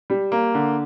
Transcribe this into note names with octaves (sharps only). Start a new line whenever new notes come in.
G3
A#3
D3